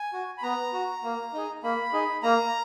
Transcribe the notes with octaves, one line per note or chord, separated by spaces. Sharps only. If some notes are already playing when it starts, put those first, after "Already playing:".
Already playing: G#5
F#4
B5
B3 A#5
F#4
A#3
D#4 G#4
A#3 B5
D#4 G#4
A#3 A#5